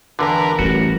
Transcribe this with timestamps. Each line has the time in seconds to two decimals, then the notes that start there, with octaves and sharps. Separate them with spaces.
0.19 E2 D3 A#4 B4
0.59 A1 G3 F#4